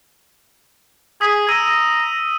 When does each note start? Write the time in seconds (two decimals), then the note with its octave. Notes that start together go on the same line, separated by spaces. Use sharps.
1.21 G#4 D#6 B6
1.49 A#5 E6 D#7